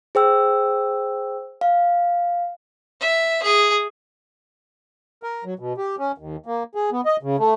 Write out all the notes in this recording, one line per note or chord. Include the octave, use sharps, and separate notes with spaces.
G#4 C5 G5 E6
F5
E5
G#4
A#4
F#3
B2
G4
C#4
D#2
A#3
G#4
B3
D#5
C#3
A3